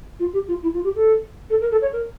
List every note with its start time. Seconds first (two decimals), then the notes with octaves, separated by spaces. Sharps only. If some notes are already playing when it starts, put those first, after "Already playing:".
0.19 F4
0.33 G4
0.48 F4
0.62 E4
0.74 F4
0.84 G4
0.95 A4
1.50 A4
1.61 A#4
1.71 A4
1.82 C#5
1.93 A#4